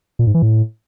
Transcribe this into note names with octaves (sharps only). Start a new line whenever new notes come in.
A#2
G#2
E3
A2